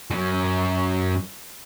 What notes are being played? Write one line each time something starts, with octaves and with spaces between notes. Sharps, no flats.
F#2 F#3